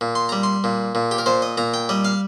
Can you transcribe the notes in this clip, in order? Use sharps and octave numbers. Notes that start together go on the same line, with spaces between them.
A#2
C6
G3 A#5
C6
A#2
A#2
G4
A#4
A#2 C5
D#5
A#2 A#5
G5
G3 D#5
F5